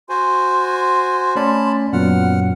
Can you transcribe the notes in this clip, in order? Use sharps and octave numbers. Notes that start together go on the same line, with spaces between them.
F#4 C5 G#5 C6
A3 C#4 D5 A5 B5
F#2 A#2 F#3 B3 F#5 F6